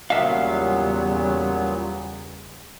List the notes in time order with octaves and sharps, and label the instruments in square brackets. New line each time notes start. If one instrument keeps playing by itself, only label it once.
[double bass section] E2 C#3 G3 [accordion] A#2 F#3 B3 [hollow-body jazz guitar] E5 F5